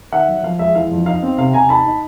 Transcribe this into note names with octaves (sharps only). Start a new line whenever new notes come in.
D#3 E5 F#5
F#3
F3 F5
G#3 E5
E3 F5
F2
D#4 F5
C4
C3 F5
C3 G#5 A#5
D#4 A5 B5
D#4